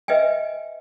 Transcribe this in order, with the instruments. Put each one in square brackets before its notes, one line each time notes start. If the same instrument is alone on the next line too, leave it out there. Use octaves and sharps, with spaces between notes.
[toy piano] B4 D#5 E5 G5 G#5